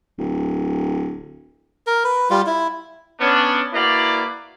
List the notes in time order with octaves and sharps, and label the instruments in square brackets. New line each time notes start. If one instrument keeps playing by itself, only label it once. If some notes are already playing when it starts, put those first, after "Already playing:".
[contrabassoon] D1
[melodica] A#4
B4
G3 F4
E4
[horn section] B3 C#4 D4
A#3 E4 F#4 B4 D5